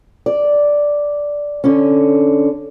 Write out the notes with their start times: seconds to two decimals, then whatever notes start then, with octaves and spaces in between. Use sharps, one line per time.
0.26 D5
1.64 D3 C#4